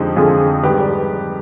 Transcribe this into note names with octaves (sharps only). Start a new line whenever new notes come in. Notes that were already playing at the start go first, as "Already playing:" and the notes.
Already playing: F2 D3 F3 G#3 D#4 G4
F2 D3 F3 G#3 F4 G#4
G#2 D#3 G3 G4 B4
B4 D5